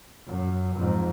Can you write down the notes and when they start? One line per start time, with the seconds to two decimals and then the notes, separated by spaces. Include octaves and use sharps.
0.27 F#2
0.75 F2 G#2